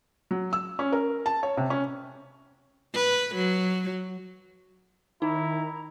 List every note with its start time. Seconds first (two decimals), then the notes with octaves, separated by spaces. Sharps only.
0.31 F#3
0.53 E6
0.79 C#4
0.92 A#4
1.26 A5
1.43 C#5
1.57 C3
1.70 C#4
2.94 B4
3.35 F#3
5.22 D#3 D#4 E4 A#5